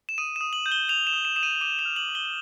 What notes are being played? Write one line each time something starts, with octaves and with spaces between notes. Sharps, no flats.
E7
D#6 D#7
D#6 E7
F#7
G6
G7
G6 F7
E7
D#6
E7
D#6 E7
D#7
D6 D#7
F7
F6
F#7
D6
G7